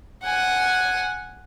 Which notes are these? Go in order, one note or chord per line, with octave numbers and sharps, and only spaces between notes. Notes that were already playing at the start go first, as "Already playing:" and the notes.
F#5 G#5